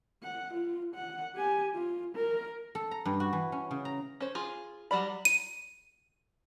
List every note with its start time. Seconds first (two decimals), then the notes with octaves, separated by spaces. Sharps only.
0.23 F#5
0.54 F4
0.95 F#5
1.35 G4 G#5
1.75 F4
2.15 A#4
2.75 A4
2.91 A#5
3.05 G2
3.20 F#4
3.33 E3
3.52 C#4
3.71 C#3
3.85 A#5
4.20 C#4 C5
4.35 F4 G#4
4.91 F#3 G3 D5 B5
5.25 D#7